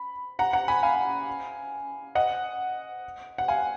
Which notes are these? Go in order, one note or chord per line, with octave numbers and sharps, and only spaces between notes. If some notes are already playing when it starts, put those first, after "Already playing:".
Already playing: B5
F#5 A#5
F#5 A#5
G#5 B5
F5 G#5
D#5 F#5
F#5
F5 G#5